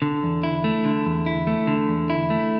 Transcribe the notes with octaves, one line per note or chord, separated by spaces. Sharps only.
D3
E2
E4
A3
D3
E2
E4
A3
D3
E2
E4
A3